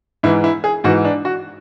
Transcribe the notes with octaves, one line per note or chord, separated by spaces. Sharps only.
G#2 E3 E4
E4
G#4
G#2 E3 F#4
D4
F#4